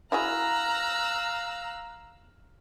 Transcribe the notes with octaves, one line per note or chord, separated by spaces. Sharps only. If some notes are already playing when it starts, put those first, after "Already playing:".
E4 F#4 G#4 F5 A#5 E6 F#6